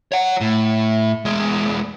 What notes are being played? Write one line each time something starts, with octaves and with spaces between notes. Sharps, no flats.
C#5 F#5
A2
E2 G#3